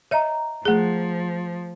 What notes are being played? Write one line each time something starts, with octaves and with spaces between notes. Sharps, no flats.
C#5 D#5 E5 A#5
F3 A3 G#4